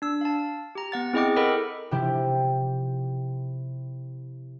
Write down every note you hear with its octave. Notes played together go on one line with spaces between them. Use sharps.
D4 E6
F5 A5
G4 A#5
B3 F#5 A6
C4 E4 G#4 D#5 G5 D6
A4 A#4 D#5 F#5 B5
C3 F3 E4 G4